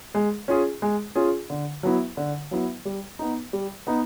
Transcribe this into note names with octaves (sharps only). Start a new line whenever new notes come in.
G#3
C#4 F4 G#4
G#3
C#4 F4 G#4
D3
F#3 B3 E4
D3
F#3 B3 E4
G3
B3 D#4
G3
B3 D#4